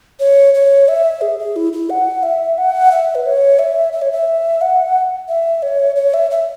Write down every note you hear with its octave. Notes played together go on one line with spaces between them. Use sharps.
C#5
C#5
E5
G#4
G#4
E4
E4
F#5
E5
F#5
E5
B4
C#5
E5
E5
C#5
E5
F#5
E5
C#5
C#5
E5
E5